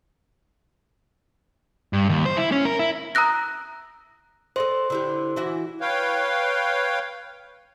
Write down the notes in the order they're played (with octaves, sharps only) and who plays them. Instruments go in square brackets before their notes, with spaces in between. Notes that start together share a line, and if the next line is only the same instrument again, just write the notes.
[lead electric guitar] G2
D#2
C5
E4
C#4
A#4
E4
[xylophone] A#5 D#6 E6 F#6 A#6
[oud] A4 D5 D#5 [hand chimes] C5 C6
[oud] D3 E4 G4
E3 E4 F#4
[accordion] B4 C#5 F5 G5